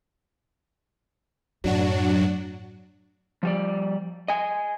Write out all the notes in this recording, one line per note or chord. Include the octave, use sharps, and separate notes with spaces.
F#2 A2 F#3 D4 F#4
F3 G3 D5
D#5 G#5